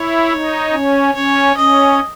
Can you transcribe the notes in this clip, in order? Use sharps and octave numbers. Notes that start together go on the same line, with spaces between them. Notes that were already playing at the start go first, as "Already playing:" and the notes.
Already playing: E4 C#5
D#4
C#4
C#4 C#5
C#4 D#5